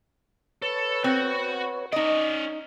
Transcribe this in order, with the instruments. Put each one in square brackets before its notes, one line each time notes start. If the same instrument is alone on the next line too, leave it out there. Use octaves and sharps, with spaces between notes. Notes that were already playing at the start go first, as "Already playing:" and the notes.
[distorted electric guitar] A4 [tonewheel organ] B4 C#5
[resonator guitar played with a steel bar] C4 [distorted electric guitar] F#4 F#5
[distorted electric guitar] C#4 D5 [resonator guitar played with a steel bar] D#4 D#5